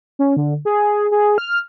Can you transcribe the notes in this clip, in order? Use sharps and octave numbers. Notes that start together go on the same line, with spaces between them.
C#4
D3
G#4
G#4
F6